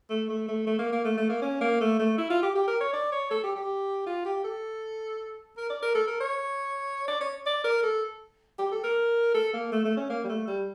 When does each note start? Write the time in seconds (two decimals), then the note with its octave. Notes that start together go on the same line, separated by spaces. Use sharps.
0.10 A3
0.29 A3
0.48 A3
0.67 A3
0.79 A#3
0.92 A#3
1.04 A3
1.17 A3
1.30 A#3
1.42 C#4
1.61 A#3
1.81 A3
1.99 A3
2.18 E4
2.30 F4
2.43 G4
2.55 G4
2.67 A#4
2.81 C#5
2.93 D5
3.12 C#5
3.31 A4
3.44 G4
3.55 G4
4.06 F4
4.25 G4
4.44 A4
5.57 A#4
5.70 D5
5.82 A#4
5.95 A4
6.08 A#4
6.20 C#5
7.08 D5
7.21 C#5
7.46 D5
7.64 A#4
7.83 A4
8.59 G4
8.72 A4
8.84 A#4
9.35 A4
9.54 A#3
9.72 A3
9.85 A3
9.97 C#4
10.10 A#3
10.24 G3
10.29 A3
10.48 G3